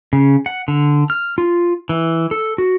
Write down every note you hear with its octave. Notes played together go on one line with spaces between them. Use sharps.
C#3
F#5
D3
F6
F4
E3
A4
F#4